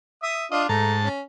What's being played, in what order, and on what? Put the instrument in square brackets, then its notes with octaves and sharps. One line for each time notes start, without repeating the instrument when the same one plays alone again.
[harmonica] E5 D#6
[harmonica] D4 F4 [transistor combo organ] D#5
[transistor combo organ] G#2 A5 [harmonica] A3 A#5
[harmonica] C#4